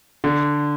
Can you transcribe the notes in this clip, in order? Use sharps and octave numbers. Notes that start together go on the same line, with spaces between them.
D3